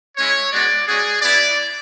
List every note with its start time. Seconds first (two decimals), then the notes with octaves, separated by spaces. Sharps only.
0.17 G#3 C#4 E4 C#5
0.52 G#3 B3 F#4 D5
0.87 G#3 C#4 F#4 G#4
1.21 B3 E4 D5